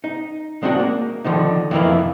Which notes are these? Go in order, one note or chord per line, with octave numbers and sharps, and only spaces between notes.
D#4
G#3 C4 D4 F#4
A#3
D3 D#3 F3 D#4
F2 C3 E3 A#3 E4 F5